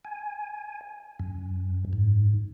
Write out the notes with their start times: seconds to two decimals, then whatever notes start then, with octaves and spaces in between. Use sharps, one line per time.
0.05 G#5
1.20 F#2
1.93 G#2